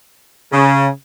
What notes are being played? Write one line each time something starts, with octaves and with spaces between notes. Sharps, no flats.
C#3